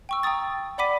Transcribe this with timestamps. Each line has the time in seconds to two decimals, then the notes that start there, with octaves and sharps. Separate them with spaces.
0.09 G5 C#6 E6
0.23 G5 A#5 C#6 D#6 A6
0.78 D5 F#5 B5 D6 B6 D#7